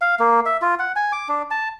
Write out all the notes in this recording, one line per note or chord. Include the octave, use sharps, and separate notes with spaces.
F5
A#3
E5
F4
F#5
G#5
D6
D4
A5